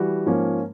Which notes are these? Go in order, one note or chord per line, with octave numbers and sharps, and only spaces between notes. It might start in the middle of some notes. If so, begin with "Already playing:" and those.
Already playing: E3 G3 F#4
G#2 F3 A#3 C#4